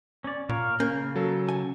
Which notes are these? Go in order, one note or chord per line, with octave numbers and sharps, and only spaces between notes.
C#4 D5
A#2 A#4 C#5 F5
C#3 A#3 C#4 G6
F#3 A4
G#5